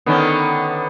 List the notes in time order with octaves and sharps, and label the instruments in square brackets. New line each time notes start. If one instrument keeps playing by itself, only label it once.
[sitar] D3 D#3 C#4 [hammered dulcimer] B3